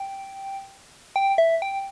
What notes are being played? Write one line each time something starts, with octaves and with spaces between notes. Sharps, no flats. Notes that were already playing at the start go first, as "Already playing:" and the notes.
Already playing: G5
G5
E5
G5